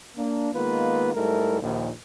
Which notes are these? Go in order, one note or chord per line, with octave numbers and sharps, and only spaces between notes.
A#3 D4
D#3 G#3 A#3 B3 F4 B4
G#2 G3 A3 E4 A4 A#4
A#1 D#2